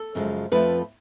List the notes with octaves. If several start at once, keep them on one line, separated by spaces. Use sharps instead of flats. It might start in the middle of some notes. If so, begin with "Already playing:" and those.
Already playing: A4
F#2 C#3 F3 G#3
F2 F3 A3 B4